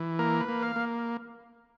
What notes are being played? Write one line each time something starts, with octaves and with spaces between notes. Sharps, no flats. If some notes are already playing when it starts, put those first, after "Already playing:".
Already playing: E3
A#3 A#4
B4
A#3
F5
A#3